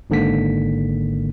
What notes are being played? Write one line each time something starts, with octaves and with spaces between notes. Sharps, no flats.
G#1 G#2 D3 A#3 B6